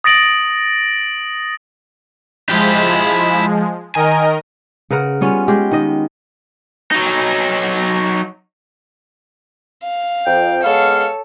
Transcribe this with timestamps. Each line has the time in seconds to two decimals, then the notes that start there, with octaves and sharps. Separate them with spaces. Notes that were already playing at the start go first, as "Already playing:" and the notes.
0.04 D#6 A6 A#6 D7 F#7
2.49 F3 G#3 E4 G4
3.95 D#3 A#4 D#5 G#5
4.90 C#3 A#4 B4 F#5
5.21 G3 B3 C#4 F4
5.48 G#3 G4
5.71 D#3 D#5
6.92 F#3 D#4
9.83 F5
10.26 F2 G5
10.63 G#3 B3 A4 C#5 F5